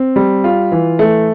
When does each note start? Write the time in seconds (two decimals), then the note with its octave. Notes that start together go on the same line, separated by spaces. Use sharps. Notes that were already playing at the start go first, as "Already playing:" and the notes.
Already playing: C4
0.16 G3
0.44 F4
0.72 E3
0.99 A3